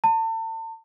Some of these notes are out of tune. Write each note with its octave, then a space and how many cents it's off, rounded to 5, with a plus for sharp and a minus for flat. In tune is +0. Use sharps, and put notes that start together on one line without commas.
A5 +35